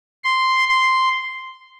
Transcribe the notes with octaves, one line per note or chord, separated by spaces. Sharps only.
C6
C6